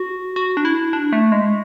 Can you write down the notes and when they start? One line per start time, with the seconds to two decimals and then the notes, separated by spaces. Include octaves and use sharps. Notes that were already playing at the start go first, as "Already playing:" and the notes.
Already playing: F#4
0.36 F#4
0.57 D4
0.65 E4
0.93 D4
1.13 A3
1.32 G#3